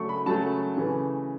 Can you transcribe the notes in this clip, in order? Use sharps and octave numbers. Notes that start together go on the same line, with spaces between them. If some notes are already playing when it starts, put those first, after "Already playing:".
Already playing: C#3 F#3 A3 C#6
B5
C#3 F#3 A3 A5
C#3 E3 A3